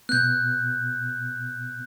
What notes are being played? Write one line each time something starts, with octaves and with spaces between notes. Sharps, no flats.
B2 B3 F#6 G6